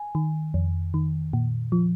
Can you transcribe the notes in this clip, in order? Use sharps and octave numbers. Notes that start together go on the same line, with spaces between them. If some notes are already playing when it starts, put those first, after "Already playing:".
Already playing: G#5
D#3
F2
D#3
A#2
F3